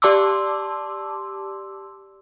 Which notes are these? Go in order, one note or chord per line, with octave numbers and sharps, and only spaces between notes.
G4 D5 A5 C6 D6 E6